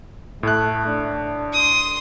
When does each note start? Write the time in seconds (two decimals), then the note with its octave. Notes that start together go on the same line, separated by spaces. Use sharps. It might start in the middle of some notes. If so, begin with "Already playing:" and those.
0.43 A2 A3 F#6
0.87 D4
1.53 C6 D#6